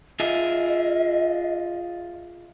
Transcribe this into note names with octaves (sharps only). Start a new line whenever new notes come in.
F4 G#4 D#5 E5